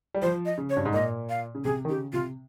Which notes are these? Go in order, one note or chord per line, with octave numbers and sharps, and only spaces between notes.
G3
F3 C5
D#5
C#3
C#5
G2
G#2
A#2 D#5
F5
C#3
C3 G#4
D#3
C#3 G4
C3 F4